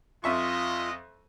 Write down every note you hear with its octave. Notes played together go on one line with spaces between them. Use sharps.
F2 G#3 F4 D#5 E5 C#6